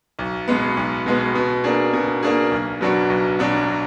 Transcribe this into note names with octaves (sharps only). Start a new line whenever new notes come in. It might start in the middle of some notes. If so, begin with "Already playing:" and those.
B1
B2 G#3 B3
B1
B2 G#3 B3
B2
A#3 D4 G#4
B2
A#3 D4 G#4
B1
B2 F#3 D4 F#4
B1
B2 F#3 D4 F#4